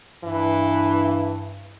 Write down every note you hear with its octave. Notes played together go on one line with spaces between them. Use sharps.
G2 E3